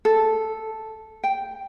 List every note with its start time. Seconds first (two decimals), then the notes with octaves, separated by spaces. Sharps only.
0.05 A4
1.24 G5